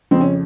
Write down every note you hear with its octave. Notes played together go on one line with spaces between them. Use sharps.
F2 C#3 F3 C4
C#4